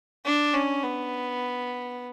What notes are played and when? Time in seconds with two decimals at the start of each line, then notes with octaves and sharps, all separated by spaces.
0.25 D4
0.54 C#4
0.83 B3